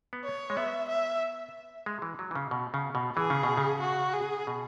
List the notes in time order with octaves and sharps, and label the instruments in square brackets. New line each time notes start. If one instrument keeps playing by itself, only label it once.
[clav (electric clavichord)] B3
[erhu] C#5
[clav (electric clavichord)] G#3
[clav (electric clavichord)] B3 [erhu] E5
[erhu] E5
[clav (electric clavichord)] G#3
E3
F#3
E3
C#3
B2
C#3
B2
[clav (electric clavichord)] E3 [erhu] G#4
[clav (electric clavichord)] C#3
B2
C#3
[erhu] F#4
G#4
[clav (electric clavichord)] B2